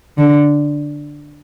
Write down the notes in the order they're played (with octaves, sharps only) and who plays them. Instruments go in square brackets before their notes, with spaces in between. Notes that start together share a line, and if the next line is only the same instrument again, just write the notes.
[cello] D3